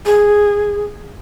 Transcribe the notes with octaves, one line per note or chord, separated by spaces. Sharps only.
G#4